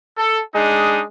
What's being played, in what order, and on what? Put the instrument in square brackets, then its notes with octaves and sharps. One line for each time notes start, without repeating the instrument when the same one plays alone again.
[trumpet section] A4
[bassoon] G#3 [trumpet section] D4 D#4 D#6